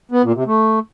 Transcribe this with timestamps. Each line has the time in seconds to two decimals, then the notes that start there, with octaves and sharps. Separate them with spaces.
0.11 B3
0.23 A#2
0.35 C3
0.46 A3